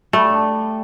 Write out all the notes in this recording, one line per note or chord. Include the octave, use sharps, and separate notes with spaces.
G3 A3
D4